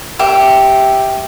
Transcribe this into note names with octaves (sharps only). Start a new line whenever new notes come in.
G4 E5